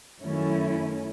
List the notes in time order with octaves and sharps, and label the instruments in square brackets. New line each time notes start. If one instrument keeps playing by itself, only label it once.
[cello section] F#2 D#3 A3 C#4 E4